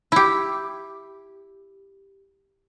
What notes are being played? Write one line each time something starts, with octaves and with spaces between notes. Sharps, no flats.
E4 G4